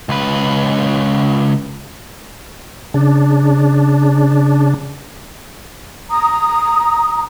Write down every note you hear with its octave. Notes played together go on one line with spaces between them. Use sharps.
C#2 B4
C#3 D4
A#5 D#6